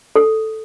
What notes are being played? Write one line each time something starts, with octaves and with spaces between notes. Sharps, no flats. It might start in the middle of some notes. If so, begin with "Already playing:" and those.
A4